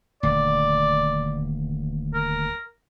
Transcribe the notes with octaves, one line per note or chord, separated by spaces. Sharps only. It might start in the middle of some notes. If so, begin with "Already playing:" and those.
D#1 D2 D5
A#4